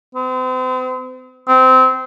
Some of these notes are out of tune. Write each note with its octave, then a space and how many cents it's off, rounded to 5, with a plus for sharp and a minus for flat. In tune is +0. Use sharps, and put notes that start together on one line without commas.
C4 -40
C4 -20